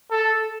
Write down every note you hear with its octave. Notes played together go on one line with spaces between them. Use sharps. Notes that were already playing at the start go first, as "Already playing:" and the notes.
A4